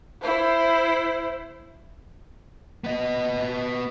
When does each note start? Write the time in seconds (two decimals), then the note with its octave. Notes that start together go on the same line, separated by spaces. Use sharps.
0.22 E4 C5
2.84 B3 D#5